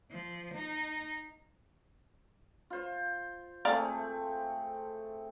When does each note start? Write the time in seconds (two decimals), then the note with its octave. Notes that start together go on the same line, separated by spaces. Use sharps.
0.11 F3
0.54 D#4
2.70 F4 C5
3.65 A3 C4 G#4 D5 F5 A#5